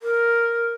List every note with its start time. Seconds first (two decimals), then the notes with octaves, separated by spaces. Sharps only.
0.01 A#4